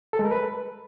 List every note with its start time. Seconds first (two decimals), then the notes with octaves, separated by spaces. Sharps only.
0.13 A4
0.19 G#3
0.25 A#4
0.31 B4